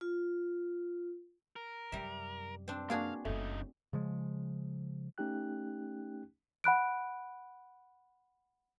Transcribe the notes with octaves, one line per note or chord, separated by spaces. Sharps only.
F4
A#4
F#2 C3 G3 E5
C4 D4
A#3 D4 F#4 G#4 D5 F5
F#1 F#2 C#3 A3 D#4
C#3 F3 G#3
A3 C#4 D#4 G4 G5 F#6
F#5 B5 F#6 D7